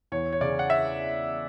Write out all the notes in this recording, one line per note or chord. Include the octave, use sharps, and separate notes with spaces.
E2 C#5
C#5
C#3 D5
F#5
E5